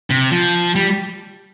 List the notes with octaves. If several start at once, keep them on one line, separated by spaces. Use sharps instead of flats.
C3
F3
G3